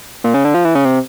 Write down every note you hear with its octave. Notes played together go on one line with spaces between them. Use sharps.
A#2
C#3
D3
F3
E3
C#3
C3